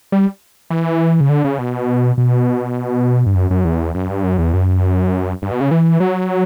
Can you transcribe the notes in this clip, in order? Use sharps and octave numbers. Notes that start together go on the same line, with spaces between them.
G3
E3
C#3
D3
C#3
B2
B2
G2
F#2
F#2
E2
F#2
G2
F#2
E2
F#2
G2
B2
C#3
E3
F#3